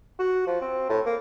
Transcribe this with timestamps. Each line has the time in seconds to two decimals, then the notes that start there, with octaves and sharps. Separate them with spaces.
0.19 F#4
0.47 F3
0.61 C4
0.89 A2
1.05 A#3